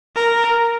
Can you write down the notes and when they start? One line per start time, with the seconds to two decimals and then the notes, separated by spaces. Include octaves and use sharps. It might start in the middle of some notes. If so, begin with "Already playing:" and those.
0.16 A#4